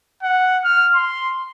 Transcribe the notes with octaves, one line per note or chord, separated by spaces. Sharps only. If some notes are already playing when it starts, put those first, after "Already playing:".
F#5
F6
C6